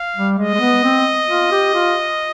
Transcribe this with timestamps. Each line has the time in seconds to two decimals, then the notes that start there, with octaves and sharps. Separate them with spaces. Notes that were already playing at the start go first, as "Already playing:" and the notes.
Already playing: F5
0.16 G3
0.38 G#3 D#5
0.54 G#3
0.60 B3
0.84 C4
1.29 F4
1.51 G4
1.74 F4